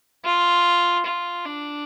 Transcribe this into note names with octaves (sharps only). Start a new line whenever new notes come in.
F4
F4
D4